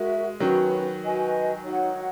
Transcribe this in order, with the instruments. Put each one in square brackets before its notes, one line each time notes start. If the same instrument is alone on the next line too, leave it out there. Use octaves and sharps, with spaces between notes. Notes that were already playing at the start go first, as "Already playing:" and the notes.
Already playing: [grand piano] G#3 [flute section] F#4 A#4 E5
[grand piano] D#3 F#3 [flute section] C#4 F#4 B4
[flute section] F#4 B4 D#5 G#5
D#4 F#4 C#5 F#5